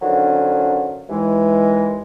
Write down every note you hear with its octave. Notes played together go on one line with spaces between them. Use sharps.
D3 D#3 F3 F#3 C#4 D4
D#2 E3 G#3